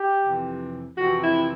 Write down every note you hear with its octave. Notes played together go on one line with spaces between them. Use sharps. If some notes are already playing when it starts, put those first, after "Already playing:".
Already playing: G4
F2 C3 E3
F2 C3 E3 F#4
E4